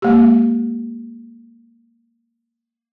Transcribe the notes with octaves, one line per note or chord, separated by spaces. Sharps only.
G#3 A#3 G4